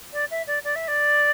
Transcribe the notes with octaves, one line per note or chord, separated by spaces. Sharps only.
D5
E5
D5
D5
E5
D5